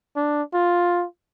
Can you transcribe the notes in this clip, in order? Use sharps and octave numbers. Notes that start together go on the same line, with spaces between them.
D4
F4